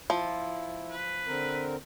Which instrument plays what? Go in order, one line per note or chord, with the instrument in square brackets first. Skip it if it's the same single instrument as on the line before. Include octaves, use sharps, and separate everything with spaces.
[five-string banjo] F3 [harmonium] E4
[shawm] B4
[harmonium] D3 C4 A#4